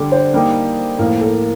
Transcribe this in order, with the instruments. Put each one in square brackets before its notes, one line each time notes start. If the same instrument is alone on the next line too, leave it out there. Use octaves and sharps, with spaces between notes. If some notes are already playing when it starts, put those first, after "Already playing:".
Already playing: [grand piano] D3 G3 D4 [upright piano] A4
[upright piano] C5
[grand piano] G3 A#3 D#4 G4
[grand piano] A2 F3 A#3 [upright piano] A#4
[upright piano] A4